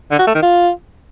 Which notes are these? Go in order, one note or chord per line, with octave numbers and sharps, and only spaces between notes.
D3
F#4
A3
D#3
F4